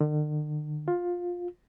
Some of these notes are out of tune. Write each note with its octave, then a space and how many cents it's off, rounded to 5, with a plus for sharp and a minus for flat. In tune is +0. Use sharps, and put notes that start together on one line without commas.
D3 +45
F4 +15